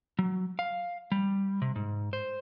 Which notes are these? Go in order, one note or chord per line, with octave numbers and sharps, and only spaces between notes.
F#3
F5
G3
C3
G#2
C5